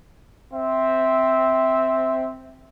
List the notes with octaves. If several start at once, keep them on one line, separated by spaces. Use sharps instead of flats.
C4 E5